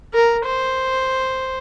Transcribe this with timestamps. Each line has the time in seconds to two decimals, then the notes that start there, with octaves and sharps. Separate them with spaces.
0.14 A#4
0.46 C5